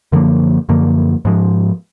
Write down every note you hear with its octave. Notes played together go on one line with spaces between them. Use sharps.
F#2 D3 F3 A#3
F#2 D3 F3 A#3
G#2 F3 G#3